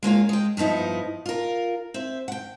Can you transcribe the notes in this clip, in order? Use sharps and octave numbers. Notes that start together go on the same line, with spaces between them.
G#3 A#3 C#4 F4
G#3 G5
G2 F3 B3 D#4 E4
F4 A#4
C4 E5
F#5 G5